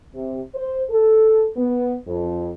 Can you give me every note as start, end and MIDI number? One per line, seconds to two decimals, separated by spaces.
0.14 0.40 48
0.55 0.81 72
0.90 1.46 69
1.56 1.94 59
2.07 2.50 41